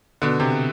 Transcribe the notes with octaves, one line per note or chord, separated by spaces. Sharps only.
B2 D3
C3